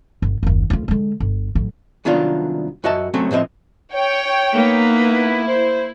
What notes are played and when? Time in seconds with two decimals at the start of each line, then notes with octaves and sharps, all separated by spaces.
0.22 G1
0.43 F#1 D#2
0.70 D2 F4
0.88 D3 G#3
1.20 G1
1.55 A1 F#3
2.05 C2 D#3 F#3 B3 D4 F4
2.84 F#2 F#4 D#5 E5 A5
3.14 F#3 A3 C4 C#4
3.31 A2 F3 C4 D#5 E5
3.92 C#5 G5
4.53 A#3 B3 D#4 B4
4.92 E4
5.47 C5